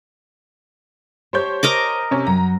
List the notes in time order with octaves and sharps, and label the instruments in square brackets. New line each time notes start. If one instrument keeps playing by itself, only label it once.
[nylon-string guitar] G4 A5 [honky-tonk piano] C5 C#5 G6
[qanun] A#4 D#5 D6
[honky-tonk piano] C3 C#4
[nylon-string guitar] F#2 F3 F#3 [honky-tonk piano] A#5